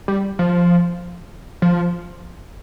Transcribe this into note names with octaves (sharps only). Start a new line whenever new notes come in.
G3
F3
F3